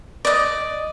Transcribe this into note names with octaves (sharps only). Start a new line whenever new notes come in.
D5 D#5